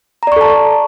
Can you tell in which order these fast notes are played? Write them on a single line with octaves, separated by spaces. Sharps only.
A#5 D5 C#6 A4 A5